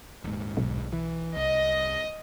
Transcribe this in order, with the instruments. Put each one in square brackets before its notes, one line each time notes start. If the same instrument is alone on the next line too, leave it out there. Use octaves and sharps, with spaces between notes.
[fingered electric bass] D#1 G#2
[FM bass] B1
[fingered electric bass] E3
[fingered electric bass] C2 [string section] D#5